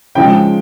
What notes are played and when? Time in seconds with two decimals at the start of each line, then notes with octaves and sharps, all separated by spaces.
0.15 C#3 F3 G#3 G5